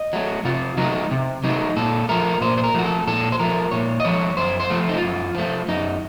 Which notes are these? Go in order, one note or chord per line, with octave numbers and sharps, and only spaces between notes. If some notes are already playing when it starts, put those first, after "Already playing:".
Already playing: D#5
F#3 A3
C3 F4
F#3 A3 D#4
C3
F#3 A3 D#4
A#2 A4
F3 A3 A#4
A#2 C5
C5
A#4
F3 A3 F#4
A4
A#2 A4
C5
F3 A3 A#4
A#2 C#5
D#5
F3 A3 C#5
F#2 C5
C5
F3 A3
F4
D#4
F4
F#2
F3 A3
F#2 D#4